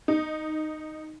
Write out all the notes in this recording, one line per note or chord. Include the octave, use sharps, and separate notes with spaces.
D#4